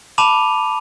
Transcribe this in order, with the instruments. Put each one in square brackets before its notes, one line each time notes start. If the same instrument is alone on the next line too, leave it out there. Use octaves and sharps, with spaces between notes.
[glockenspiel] A5 B5 D6 D#7 F7